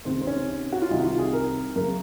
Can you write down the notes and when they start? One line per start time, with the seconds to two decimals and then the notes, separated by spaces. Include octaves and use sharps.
0.05 C#2 C3 D#3 C4
0.21 C4
0.27 C#4
0.72 F#4
0.82 F4
0.91 C2 C3 D#3 D#4
1.01 F#4
1.05 F4
1.19 G#4
1.33 A#4
1.75 F#2 C#3 A#4